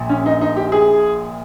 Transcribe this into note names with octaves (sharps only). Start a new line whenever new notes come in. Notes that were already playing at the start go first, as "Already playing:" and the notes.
Already playing: A#1 A#2
C#4
D#4
D#4
G4
G#4